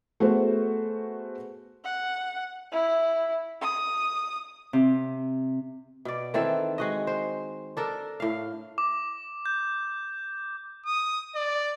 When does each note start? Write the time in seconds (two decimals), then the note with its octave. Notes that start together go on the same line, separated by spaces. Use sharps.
0.20 A3 B3 F#4 G#4 C5
1.84 F#5
2.72 E4
3.61 D#6
4.73 C3
6.05 B2 D5
6.34 D#3 E3 C4 A4
6.78 G#3 F#4 D#5
7.07 C5
7.77 D4 A4 A#4
8.20 A2 F5
8.78 D6
9.46 G6
10.86 D#6
11.36 D5